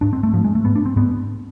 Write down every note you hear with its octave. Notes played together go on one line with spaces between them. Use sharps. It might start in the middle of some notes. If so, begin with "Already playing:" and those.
G#2 D4
C4
A3
G#2 F3
G#3
A3
G#2 B3
D4
C4
G#2 B3